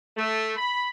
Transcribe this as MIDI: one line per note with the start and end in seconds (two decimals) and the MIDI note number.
0.17 0.54 57
0.56 0.90 83